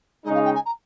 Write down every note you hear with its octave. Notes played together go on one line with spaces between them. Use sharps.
C#3 G#3 D#4 D#5
F5
G5
G#5
A#5